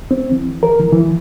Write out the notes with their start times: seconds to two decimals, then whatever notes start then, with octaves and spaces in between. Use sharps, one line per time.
0.11 C4
0.32 E3
0.63 A#4
0.80 E3
0.92 E3